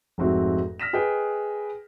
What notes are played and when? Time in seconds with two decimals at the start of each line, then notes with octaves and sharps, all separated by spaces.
0.18 F1 G#2 C4 F#4 E5
0.80 F6 A#6 B6 E7
0.93 G#4 B4 D#5 G5